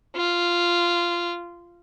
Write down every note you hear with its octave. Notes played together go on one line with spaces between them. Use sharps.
F4